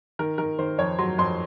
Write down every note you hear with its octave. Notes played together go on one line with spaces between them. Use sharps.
D#3 A#4
D#3 A#4
D#3 C5
F2 C#5
F#3 C6
F2 C6